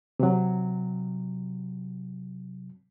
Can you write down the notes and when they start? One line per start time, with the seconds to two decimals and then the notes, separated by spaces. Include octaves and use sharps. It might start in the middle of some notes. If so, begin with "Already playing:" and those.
0.20 C3 F#3